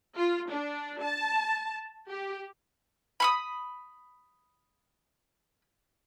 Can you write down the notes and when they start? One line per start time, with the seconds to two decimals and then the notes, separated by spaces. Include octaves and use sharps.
0.16 F4
0.50 D4
1.02 A5
2.08 G4
3.20 B5 C#6 D#6